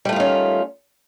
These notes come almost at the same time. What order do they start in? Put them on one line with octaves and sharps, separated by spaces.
G3 A3 F4 D#3 C#4